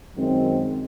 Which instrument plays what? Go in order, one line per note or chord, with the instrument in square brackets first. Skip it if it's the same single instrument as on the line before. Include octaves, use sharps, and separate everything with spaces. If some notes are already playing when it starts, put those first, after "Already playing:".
[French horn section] F#2 D#3 G#3 C4